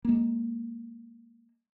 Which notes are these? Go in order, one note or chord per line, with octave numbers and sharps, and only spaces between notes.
G#3 A#3